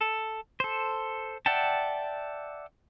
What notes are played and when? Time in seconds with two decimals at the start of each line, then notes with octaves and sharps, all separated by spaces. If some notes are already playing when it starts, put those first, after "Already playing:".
0.01 A4
0.60 A4 C5
1.46 D5 E5 F#5 G5 A5